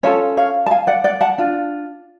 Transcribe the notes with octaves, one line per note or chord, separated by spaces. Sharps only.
C#4 F4 A4 C#5
C#5 F5
A5
F5 G#5
D5 F#5
D5 F#5
F#5 A5
D4 F4